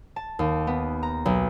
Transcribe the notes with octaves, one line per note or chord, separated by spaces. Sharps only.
A5
D#2
B3
A#5
B1